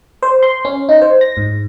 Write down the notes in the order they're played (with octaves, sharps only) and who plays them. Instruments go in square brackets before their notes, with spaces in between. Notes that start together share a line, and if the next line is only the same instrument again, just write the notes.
[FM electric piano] C5
C6
C#4
D#4
C5
A#6
G#2